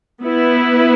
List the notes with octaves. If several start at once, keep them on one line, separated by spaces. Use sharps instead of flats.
B3 E4 B4